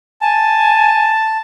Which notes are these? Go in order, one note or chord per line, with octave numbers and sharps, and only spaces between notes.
G#5 A5